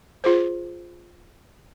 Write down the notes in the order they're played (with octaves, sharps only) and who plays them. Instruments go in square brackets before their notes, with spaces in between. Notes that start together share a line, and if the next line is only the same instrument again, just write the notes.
[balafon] F4 G#4 C5